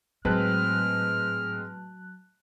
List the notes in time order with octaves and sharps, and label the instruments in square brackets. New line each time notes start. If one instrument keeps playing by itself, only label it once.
[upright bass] A2 [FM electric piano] F#3 A5 F#6 [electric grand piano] G#3 C4 B4 [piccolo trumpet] F6